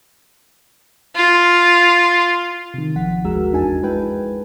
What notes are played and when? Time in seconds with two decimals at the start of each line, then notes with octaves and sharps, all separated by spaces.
1.16 F4
2.74 C3 D#3
2.95 G#1 F3 F#5 B6
3.24 G#1 D#2 G#3 F#4 A#4 E6
3.52 G1 E2 D4 D#4 G#5 A5
3.83 G#3 E4 B4 G5 G#5